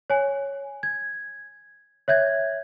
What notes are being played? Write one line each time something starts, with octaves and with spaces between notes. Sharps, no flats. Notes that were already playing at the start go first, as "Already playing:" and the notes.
C#5 G#5
G#6
C#5 E5 G6 G#6